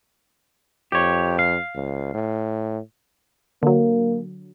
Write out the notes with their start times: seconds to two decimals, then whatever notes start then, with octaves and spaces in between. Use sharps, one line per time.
0.92 F2 G4 C#5
1.39 F5
1.75 C#2
2.14 A2
3.63 D3 F#3 A#3